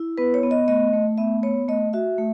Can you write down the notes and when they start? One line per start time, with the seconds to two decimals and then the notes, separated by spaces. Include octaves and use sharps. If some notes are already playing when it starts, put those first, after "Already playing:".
Already playing: E4
0.18 B3 B4
0.34 C#5
0.43 B3
0.51 D#5
0.68 A3 D#5
0.93 A3
1.18 B3 E5
1.43 B3 C#5
1.68 A3 D#5
1.93 F#4 E5
2.18 A3